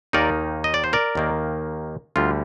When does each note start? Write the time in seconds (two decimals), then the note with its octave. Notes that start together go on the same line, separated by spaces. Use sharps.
0.13 D#2 D#3 A#3 D#4 A#4 D5
0.64 D#5
0.74 D5
0.84 C5
0.93 A#4 D5
1.15 D#2 D#3 A#3
2.16 D2 D3 G3 F4